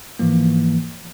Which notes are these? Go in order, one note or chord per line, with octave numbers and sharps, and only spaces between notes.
G#2 E3 F3 A#3